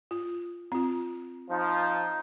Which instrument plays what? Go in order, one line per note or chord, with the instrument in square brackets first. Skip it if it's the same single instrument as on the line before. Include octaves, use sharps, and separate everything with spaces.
[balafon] F4
C4 F4
[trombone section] F3 [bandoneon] D#4